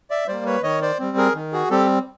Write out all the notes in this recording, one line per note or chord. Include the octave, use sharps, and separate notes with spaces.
D5 E5
G3 A#3 C5 D5
B4 C#5
D#3 C#5 D#5
C5 D5
G3 C4
G#4 A#4
D#3
F#4 G#4
G3 C4 G4 A4